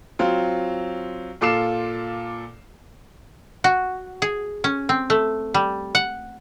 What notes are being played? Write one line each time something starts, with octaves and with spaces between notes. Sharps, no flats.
F#3 C4 F4
A#2 F4 A4 D6 C7 E7
F#4
G#4
C#4
C4
A3
G3
F#5